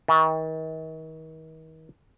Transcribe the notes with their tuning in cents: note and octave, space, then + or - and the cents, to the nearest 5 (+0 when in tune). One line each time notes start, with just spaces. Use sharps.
D#3 +40